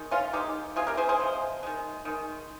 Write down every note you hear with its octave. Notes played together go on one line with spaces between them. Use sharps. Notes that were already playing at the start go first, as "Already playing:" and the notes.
Already playing: D#3 G#3
C#4 F4
D#3 G#3 D#4 G4
C3 F3 G#3 F4 G#4
G4 A#4
G#4 C5
G#4 C5
C3 F3 G#3
D#3 G#3
D#3 G#3